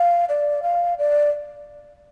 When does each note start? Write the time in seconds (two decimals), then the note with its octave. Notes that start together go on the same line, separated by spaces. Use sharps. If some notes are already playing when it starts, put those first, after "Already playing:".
Already playing: F5
0.29 D5
0.63 F5
0.99 D5